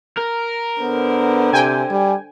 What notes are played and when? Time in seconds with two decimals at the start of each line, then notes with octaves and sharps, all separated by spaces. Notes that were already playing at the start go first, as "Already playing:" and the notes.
0.18 A#4
0.81 D3 B3 C5
1.53 C3 G5 G#5
1.91 G3